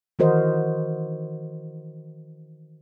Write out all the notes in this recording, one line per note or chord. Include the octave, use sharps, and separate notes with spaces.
D#3 E3 F#4 A#4 C5 D#5